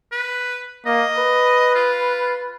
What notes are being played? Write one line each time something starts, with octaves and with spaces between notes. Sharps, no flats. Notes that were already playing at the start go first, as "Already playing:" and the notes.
B4
A#3 D#5
B4
F4